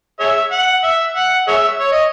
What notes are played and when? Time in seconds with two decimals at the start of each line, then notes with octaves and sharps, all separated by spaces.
0.20 G#4 C#5 E5
0.52 F#5
0.84 E5
1.16 F#5
1.48 G#4 C#5 E5
1.80 C#5
1.92 D#5